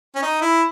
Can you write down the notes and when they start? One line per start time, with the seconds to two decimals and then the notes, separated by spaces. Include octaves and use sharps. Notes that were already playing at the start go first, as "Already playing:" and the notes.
0.15 C#4
0.22 D#4
0.42 E4